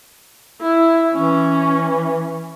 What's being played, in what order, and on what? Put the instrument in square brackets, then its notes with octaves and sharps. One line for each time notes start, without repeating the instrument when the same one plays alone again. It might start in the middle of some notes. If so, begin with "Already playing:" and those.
[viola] E4
[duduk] E3 [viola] C#4